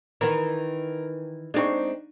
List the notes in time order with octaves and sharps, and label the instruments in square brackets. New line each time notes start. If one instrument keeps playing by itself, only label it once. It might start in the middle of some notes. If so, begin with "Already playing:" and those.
[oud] D#3 E3 [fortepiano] A#4
[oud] G#3 C4 [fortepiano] D4 D#4 C#6